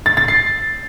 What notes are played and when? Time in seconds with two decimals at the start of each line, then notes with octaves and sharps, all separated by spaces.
0.06 A6
0.17 A6
0.28 C7